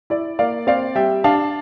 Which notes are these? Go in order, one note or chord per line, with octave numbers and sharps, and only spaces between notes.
E4 D5
A#3 D5 F5
C4 D5 F5
G3 E5 G5
D4 F5 A5